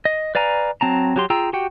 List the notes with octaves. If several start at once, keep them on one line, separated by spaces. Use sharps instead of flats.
D#5
B4 D5 F5 G#5 A#5
F#3 C4 A5 A#5
F#3 G4 C6
F4 G#4 G5 A#5 E6
F#4 G4 F#5 G5